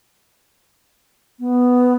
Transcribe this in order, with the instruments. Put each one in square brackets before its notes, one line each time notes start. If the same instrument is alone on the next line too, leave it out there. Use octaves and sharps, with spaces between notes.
[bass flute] B3